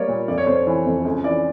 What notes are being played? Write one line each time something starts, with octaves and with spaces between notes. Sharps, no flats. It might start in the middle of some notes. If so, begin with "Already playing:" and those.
Already playing: G3 A#3 C#5 D5
A#2
F1 D5
C#5
C3 C5
C#5
E3
F2
C#2
E3 D5